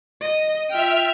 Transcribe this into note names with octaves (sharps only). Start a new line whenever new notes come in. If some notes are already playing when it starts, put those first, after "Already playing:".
D#5
F4 E5 G5 F6